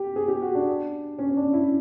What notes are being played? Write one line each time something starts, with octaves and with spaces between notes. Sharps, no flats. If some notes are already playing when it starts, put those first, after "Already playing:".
Already playing: G4
G#4
G4
F#4
D4
C#4
C#4
D4
E4